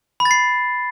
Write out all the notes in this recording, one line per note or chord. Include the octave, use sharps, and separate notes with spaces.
B5
A6
C7